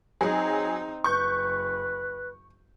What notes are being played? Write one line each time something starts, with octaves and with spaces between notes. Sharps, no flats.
F#3 C4 D#4 G#4
F#1 B4 C#6 G6